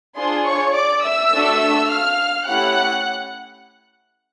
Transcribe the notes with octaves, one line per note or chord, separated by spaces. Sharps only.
D4 F4 G#4 C5 C6
C#5 C#6
D5 D6
E5 E6
A3 D4 F#4 A4
F5 F6
A3 C#4 E4 G4 F#5 F#6